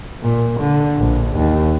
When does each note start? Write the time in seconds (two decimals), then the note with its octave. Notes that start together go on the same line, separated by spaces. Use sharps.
0.23 A#2
0.60 D3
0.98 A#1
1.36 D#2